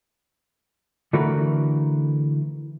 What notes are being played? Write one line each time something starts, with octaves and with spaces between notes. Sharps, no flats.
D3 E3 A3 F#4 A#4 B4